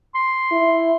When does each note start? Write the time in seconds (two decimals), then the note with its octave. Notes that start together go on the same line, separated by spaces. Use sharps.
0.15 C6
0.52 E4